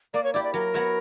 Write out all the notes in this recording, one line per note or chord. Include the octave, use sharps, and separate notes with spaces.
A#3 D5
C#5
E4 G4 D5
D5
F#3 A#4
B3 F#4 C#5 E5